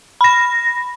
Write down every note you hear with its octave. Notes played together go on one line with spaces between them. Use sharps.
B5 A#6